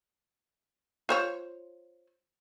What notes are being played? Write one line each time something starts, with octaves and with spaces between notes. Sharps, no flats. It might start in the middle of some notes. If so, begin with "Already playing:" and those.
F4 C5 C#5